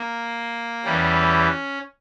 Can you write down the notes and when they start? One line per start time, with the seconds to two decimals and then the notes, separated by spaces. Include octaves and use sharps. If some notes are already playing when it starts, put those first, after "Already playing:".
Already playing: A#3
0.84 E2 E3 G3 C#4